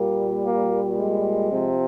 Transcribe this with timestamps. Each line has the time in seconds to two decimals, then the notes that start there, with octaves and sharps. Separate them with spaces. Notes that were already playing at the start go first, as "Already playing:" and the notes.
Already playing: A#2 G3 A#3
0.46 A#3
0.99 G#3
1.52 C3 F3